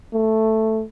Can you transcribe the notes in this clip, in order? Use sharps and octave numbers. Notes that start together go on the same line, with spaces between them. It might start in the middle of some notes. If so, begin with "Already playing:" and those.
A3